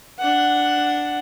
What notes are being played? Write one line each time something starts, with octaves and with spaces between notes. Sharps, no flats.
D4 F#5